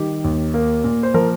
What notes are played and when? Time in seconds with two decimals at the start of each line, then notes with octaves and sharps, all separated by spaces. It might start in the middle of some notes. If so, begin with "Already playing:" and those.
Already playing: D#3 G3 G4
0.24 D#2
0.54 A#3
0.84 A#2
1.03 C5
1.14 F3 A#4